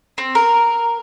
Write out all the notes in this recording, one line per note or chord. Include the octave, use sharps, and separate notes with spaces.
C4
A#4